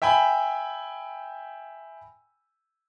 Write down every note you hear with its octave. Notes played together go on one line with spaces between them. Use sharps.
E5 G5 G#5 B5